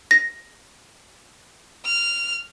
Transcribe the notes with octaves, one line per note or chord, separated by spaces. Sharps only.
A#6
F6